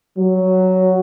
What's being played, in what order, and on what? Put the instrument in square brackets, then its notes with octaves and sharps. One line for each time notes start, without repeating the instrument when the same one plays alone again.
[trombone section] F#3